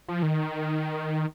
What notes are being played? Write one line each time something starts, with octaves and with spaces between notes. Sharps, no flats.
F3
D#3